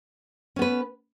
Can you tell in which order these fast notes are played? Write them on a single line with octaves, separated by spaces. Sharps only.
C#4 B3 B4